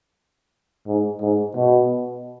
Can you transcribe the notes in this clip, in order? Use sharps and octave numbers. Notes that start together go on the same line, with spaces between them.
G#2
G#2
B2